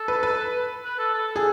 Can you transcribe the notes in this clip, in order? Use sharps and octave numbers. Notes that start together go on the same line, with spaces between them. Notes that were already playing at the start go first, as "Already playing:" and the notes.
Already playing: A4
B4
B4
B4
A4
A4
A4
G#4